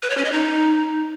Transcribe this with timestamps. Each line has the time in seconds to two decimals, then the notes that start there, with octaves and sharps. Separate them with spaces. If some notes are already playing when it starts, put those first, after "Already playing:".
0.03 B4
0.10 C#5
0.17 C#4
0.25 D#5
0.32 D#4